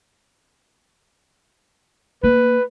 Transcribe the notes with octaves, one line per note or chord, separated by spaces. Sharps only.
A#3 B4